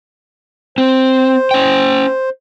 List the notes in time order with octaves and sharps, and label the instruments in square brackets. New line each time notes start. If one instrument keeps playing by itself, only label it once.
[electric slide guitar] C4 [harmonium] C5
[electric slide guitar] C#4 G5